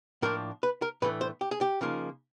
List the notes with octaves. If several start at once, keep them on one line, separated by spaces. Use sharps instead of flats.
A2 F3 A#3 D4 A#4
B4
A#4
A2 E3 A3 D4 B4
C5
G4
G#4
G4
C#3 F3 A#3 D#4